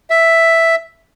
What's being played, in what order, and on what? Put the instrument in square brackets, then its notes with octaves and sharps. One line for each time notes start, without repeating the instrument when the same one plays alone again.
[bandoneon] E5